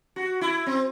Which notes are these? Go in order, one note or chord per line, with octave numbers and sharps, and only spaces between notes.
F#4
E4
C4